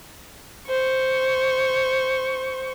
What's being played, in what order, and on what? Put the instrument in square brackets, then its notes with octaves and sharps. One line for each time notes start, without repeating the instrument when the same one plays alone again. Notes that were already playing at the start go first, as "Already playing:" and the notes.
[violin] C5 C#6